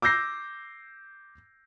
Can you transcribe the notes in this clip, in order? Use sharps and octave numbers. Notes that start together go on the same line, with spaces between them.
D6 E6 G6 A#6 C7